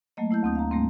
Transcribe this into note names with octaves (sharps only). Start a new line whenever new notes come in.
F#3 A3 A#3 D#5
A3 E4 A5 G6
D2 C4 D#6 G6
F5 A#5
G#2 G3 A3 A#3 C4